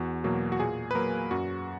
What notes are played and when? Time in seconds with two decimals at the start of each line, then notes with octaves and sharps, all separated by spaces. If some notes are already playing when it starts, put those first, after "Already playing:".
Already playing: E2 F#4
0.24 B2 F#3 A#3
0.52 F#4
0.60 A#2 G#4
0.91 B4
0.95 F#3 A#3 A#4
1.31 F#2 F#4